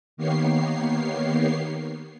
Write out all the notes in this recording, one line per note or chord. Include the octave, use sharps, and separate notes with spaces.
D#3 A#3 B3 G4 C#5 C7